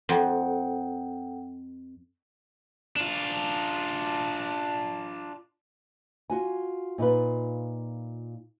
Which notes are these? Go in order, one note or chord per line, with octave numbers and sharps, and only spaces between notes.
F2 A4 F#5 G5
D4 F4
F4 F#4 G#5
A#2 D#4 F4 B4